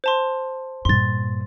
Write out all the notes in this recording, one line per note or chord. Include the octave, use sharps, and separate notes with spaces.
C5 A5 C6
G2 A#2 C6 A6